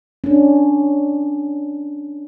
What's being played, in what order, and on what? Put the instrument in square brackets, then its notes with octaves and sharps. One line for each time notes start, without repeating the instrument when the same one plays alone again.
[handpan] C#4 D4